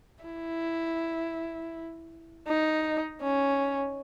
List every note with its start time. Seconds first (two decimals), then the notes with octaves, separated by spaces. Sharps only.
0.24 E4
2.48 D#4
3.22 C#4